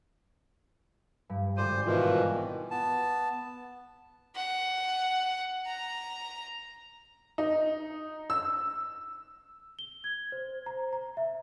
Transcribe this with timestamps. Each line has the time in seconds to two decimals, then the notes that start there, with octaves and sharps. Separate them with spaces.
1.29 G2
1.57 G#1 C5 D5 D#7
1.86 B2 D#3 E3 F4
2.71 B3 A5
4.36 F#5
5.66 A#5
7.38 D#4
8.30 E6
9.79 G7
10.04 G#6
10.32 C5
10.66 A#5
10.93 A#5
11.17 E5